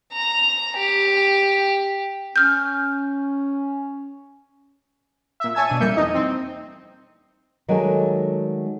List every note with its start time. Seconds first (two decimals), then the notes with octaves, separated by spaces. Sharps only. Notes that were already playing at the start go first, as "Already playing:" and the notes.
0.13 A#5
0.76 G4
2.36 C#4 F6 G6
5.40 A#2 E5
5.55 C#5 E5 G#5 A5 E6 G#6
5.67 B2 D4 D#7
5.80 F2 G3 A#3 E5 G6 C#7
5.97 E2 D#4 D#5
6.15 C4
7.68 D#3 F#3 G#3 A3 D5 G#5